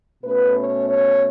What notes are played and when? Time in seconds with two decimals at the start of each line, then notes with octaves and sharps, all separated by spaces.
0.23 B2 A3 C#4 B4
0.56 C#5
0.88 C#5